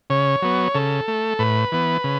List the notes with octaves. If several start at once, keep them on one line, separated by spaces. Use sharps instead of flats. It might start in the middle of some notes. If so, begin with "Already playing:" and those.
C#3 C#5
F#3 B3
C#3 A4
A3
A2 B4
E3 B3
C#3